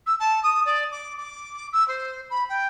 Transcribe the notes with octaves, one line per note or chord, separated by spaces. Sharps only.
E6
A5
D#6
D5
D6
D6
E6
C5
B5
G5